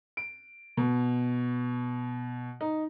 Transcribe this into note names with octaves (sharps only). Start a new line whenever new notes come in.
D7
B2
D#4